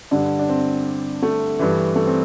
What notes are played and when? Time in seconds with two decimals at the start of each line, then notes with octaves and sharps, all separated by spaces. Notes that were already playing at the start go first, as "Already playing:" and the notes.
0.11 G2 D3 D4
0.39 D4
0.48 C4
1.22 A3
1.59 G2 E3
1.96 A3
2.06 C4